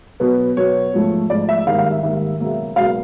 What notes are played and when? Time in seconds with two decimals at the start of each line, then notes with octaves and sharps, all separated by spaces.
0.20 B2 F#3 B3
0.57 B2 F#3 B3 C#5
0.94 G#2 F3 A3
1.30 G#2 F3 A3 D5
1.49 E5
1.66 G#2 D#3 G3 A#3 F5
1.78 F5
1.91 E5
2.03 G#2 D#3 G3 A#3 E5
2.40 C#2 B2 F#3 A#3
2.76 C#2 B2 F#3 A#3 F5